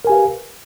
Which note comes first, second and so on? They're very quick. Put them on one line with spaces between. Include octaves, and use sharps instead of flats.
A#4 G#5 G4 F5 B4